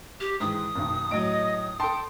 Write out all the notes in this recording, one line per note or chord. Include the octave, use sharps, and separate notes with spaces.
G4
G#2 D#3 E3 D#6
F#1 B1 D#3
A2 F#3 D#5 D7
A4 G5 A5 C6